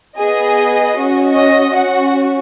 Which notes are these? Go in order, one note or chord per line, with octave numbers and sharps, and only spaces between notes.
B3 G#4 D#5
C#4 F#4
D#5
C#4 F#4 F#5